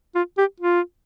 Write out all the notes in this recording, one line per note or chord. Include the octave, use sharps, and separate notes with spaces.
F4
G4
F4